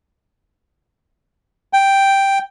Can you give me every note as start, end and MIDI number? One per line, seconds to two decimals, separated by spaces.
1.73 2.38 79